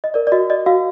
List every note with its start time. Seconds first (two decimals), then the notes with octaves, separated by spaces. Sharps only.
0.04 D#5
0.14 A#4 D5
0.27 D5
0.32 F#4 D#5
0.50 D5 D#5
0.66 F#4 F5